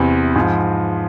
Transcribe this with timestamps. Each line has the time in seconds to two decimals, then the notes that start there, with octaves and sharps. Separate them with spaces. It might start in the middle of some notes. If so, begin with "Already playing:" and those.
Already playing: E2 C3 E3
0.36 G#2 F3